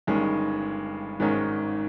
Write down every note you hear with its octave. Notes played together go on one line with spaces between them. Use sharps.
G1 G2 D#3 G#3 C#4
G#1 G#2 D#3 G#3 C#4